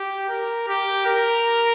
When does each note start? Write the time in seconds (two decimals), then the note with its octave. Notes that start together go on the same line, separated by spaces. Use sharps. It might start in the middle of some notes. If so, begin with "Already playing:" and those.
Already playing: G4
0.29 A#4
0.68 G4
1.06 A#4